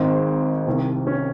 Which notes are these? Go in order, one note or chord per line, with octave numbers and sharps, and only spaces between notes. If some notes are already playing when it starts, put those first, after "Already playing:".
Already playing: G#1 G#2 D#3 C4
C2 C3 D#3
C#4